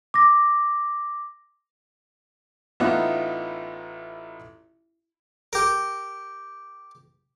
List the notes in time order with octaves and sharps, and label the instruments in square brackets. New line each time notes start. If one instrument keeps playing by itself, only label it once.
[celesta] D6 A#6
[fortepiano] A1 B3 D#4 F4 E5 F#6
[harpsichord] G4 A#4